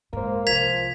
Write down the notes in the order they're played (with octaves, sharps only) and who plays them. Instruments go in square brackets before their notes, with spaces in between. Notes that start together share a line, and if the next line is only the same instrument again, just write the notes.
[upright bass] G#2 [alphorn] A#3 [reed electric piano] A#4 C5
[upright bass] C2 [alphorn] F3 [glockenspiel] G#6 B6 F7